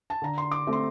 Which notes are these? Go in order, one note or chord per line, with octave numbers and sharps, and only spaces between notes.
A5
D3 A#5
C6
D6
A3 C4
C6